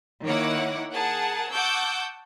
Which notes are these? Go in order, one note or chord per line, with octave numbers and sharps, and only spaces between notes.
D#3 A#3 E4 C#5 F#5 D6
G#4 A#4 F#5 A5
F#5 A5 C#6 D6 E6 G6